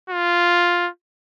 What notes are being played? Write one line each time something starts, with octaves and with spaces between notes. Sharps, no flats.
F4